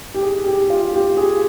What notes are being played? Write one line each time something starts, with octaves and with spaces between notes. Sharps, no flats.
G4
G#4
G4
F4
G4
G#4